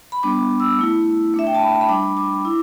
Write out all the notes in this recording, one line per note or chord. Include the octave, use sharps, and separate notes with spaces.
B5
G3 B3 D4 D6
E6
A3 E4
A3 D4 E5
G5
A5
B5
B5
G3 D4 D6
D6
E4